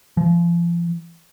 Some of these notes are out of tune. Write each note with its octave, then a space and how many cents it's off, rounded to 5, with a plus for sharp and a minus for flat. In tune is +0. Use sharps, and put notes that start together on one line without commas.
F3 -35